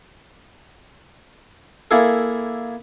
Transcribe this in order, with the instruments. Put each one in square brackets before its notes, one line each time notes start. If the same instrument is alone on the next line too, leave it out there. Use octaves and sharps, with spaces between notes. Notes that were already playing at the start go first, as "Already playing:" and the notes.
[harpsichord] A#3 E4 G#4 A4